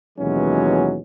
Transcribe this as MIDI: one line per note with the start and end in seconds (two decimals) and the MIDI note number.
0.18 1.00 39
0.18 1.00 47
0.18 1.00 52
0.18 1.00 54
0.18 1.00 56
0.18 1.00 61